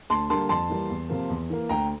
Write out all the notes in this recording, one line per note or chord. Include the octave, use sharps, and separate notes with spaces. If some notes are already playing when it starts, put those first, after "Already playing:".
D2 A5 C6
D3 G3 A#3 A5 C6
F2 A5 C6
E3 G3 A#3
E2
C3 F3 A#3
E2
E3 A#3
D2 G5 A#5